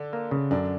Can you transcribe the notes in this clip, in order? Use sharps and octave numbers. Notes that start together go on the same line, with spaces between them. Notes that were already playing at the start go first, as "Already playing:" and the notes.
Already playing: D3 D4
A#3
C#3
F#2 D3 D4